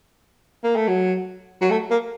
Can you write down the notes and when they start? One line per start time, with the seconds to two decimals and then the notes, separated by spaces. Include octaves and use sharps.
0.64 A#3
0.76 A3
0.88 F#3
1.61 F#3
1.71 A3
1.91 A#3